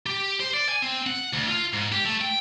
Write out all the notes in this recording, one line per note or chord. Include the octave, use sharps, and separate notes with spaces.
G4
C5
D5
G#5
C4
F#5
D2
F4
G#2
G4
A3
G5